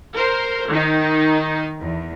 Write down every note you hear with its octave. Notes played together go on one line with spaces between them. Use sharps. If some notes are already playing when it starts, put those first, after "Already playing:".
A#4 C5
D#3 D#4
E2